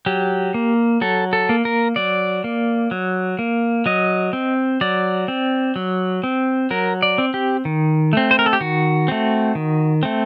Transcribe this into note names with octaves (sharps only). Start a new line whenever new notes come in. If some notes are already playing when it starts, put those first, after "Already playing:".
F#3 G4
A#3
F#3 A4
A4
A#3
A#4
F#3 D5
A#3
F#3
A#3
F#3 D#5
C4
F#3 D5
C4
F#3
C4
F#3 A#4
D5
C4
G4
D#3
A3 C4
C5
A#4
A4
G4
D#3 F#4
A3 C4
D#3
A3 C4